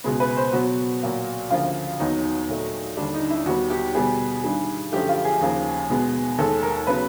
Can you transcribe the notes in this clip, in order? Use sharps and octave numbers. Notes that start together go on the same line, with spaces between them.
C#2 B2 G#3 B3
B4
C5
B2 F#3 B3 F#4
A#2 F#3 A#3
D2 C#3 F3 A#3 F4
D#2 D#3 F#3 B3 D#4
A#2 F#3 A3
D#2 D3 G3 D4
D#4
E4
D#2 D#3 G3 B3 F#4
G4
B2 G3 B3 G#4
G2 D#3 G3
F#2 D3 F3 A3 G4
F4
G#4
D#2 C#3 F3 A#3
B2 G#3 B3
D#2 D#3 G#3 A4
A#4
C#3 F#3 B3 B4